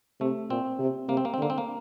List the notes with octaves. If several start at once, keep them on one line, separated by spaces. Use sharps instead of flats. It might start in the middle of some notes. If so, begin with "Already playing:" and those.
C3 A3
A#2 C4
C3
C3 A#3
C4
A#3
C4
D3
A#3
C4
A#3